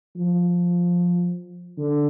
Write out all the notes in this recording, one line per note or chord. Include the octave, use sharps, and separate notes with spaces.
F3
D3